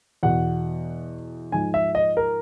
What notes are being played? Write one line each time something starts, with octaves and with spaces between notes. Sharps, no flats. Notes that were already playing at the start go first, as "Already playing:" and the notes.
E2 B2 F#5
G#2 F3 G#5
E5
D#5
A#4